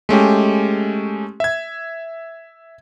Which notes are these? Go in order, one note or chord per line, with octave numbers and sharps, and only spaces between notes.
G#3 A3 C#4 G4
E5 G#6